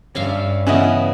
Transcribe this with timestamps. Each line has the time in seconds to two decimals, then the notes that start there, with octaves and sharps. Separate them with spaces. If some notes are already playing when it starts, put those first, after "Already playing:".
0.15 G2 C#4 E5 F5
0.67 C#3 E3 B3 C#4 E4 D#5